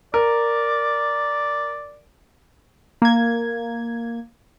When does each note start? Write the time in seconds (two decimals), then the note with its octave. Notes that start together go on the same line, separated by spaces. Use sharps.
0.14 A#4 D5
3.02 A#3 G#6